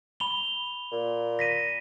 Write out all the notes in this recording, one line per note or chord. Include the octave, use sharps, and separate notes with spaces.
B5 F7 G7
A#2
A#6 B6 D#7